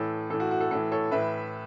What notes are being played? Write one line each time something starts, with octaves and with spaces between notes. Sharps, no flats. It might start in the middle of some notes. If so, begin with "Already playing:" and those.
Already playing: A2 E3 A4 C#5
A2 E3 A4
F#4
F#4
A4
A2 E3 A4
A4 C#5
A2 E3 B4 E5